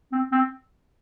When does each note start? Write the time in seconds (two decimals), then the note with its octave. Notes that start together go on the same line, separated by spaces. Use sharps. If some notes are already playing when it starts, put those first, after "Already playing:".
0.12 C4
0.32 C4